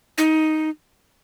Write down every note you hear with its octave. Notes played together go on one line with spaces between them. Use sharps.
D#4